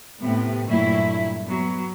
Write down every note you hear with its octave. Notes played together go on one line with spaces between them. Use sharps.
A2 C3 B3
G2 A#2 F#3 A3 E4
F#3 B3